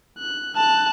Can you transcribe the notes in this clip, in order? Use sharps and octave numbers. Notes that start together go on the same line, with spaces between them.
F#6
A5 F#6